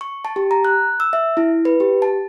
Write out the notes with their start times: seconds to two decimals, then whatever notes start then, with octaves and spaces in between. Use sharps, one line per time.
0.01 C#6
0.25 A5
0.36 G4
0.51 A#5
0.65 F#6
1.00 E6
1.13 E5
1.37 E4
1.65 B4
1.80 G4
2.02 A5